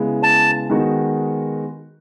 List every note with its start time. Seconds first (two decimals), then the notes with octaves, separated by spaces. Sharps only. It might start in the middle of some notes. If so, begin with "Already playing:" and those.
Already playing: C#3 G#3 B3 E4
0.23 A5
0.70 D#3 G#3 B3 D#4 F#4